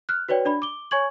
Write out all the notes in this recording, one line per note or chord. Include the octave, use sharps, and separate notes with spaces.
F6 F#6
F#4 B4 C#5 D5 G5
D4 D5 B5
D6 G7
C#5 G#5 C#6 G#6 F#7